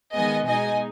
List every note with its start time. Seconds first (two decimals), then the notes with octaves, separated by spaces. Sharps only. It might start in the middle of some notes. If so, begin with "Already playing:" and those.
0.14 D#3 G#3 B3 D#5 G#5
0.47 B2 G#3 D#4 D#5 G#5